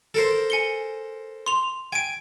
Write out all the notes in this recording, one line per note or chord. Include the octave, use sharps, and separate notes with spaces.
A4 A#4 C5
G#5 C#7 G7
C6 F7
G5 G#5 D7